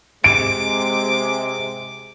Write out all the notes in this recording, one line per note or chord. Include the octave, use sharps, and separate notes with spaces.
C3 G#3 D6 D7